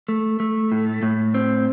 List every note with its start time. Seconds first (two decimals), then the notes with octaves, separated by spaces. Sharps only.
0.09 A3
0.40 A3
0.72 A2
1.03 A2
1.34 C4